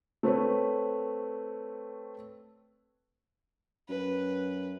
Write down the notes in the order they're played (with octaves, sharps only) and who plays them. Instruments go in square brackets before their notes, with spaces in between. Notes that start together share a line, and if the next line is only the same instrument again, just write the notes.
[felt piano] A3 C4 B4 C#5
[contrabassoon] F#2 [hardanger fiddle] B4